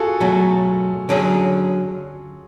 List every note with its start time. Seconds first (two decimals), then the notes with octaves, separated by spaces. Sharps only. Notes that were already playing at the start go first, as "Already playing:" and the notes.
Already playing: F4 F#4 G#4 A4
0.20 B2 F#3 A3
1.09 D3 F#3 C#4 G#4